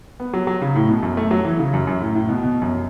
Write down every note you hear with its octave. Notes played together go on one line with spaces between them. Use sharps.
B3
F#3
F#3
C#3
A2
B2
F#2
A3
F#3
E3
C#3
F#2
F#2
A2
A2
B2
B2
F#2